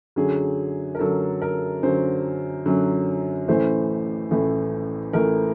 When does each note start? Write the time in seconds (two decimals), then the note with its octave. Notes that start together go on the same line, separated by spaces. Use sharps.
0.16 F#2 D3 F#3 G#4
0.95 A#4
0.99 F#2 D3 F#3 A4
1.42 A#4
1.83 F#2 D3 F#3 C5
2.66 F#2 D3 F#3
3.48 A1 A2 E3 A3 C5
4.31 A1 A2 E3 A3
5.13 A1 A2 E3 A3 A#4